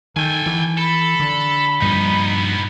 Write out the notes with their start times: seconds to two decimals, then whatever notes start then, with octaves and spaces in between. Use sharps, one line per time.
0.16 D#3 A4 G5 G#5
0.46 E3
0.77 A4 B5
1.20 D3
1.82 G2 A#2 F3 B3 D#4